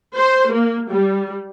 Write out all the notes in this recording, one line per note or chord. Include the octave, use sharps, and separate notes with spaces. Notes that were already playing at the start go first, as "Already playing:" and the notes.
C5
A#3
G3